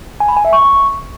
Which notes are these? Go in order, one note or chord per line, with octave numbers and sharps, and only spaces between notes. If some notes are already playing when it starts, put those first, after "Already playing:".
G#5
B5
G#5
E5
C#6